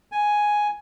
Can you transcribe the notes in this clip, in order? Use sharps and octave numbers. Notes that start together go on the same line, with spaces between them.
G#5